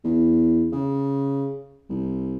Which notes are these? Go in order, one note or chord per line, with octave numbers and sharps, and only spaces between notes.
E2
C#3
C2